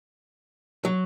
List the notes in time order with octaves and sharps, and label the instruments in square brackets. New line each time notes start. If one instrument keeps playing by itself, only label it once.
[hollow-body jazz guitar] F#3